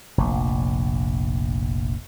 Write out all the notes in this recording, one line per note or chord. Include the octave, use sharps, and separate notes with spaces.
F1 A#1